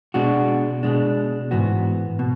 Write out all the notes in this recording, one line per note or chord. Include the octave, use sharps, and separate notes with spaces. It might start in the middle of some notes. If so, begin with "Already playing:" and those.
B2 G#3 D4 F#4
B2 G#3 D4
G#2 E3 B3 F#4
B2